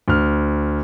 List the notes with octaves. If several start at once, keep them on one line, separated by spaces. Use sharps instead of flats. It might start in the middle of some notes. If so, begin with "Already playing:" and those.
D2 F6